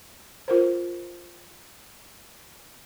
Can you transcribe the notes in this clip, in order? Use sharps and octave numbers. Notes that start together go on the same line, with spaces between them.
F4 A#4 C5